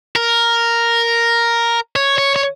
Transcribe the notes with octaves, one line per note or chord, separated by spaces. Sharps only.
A#4
C#5
C#5
C#5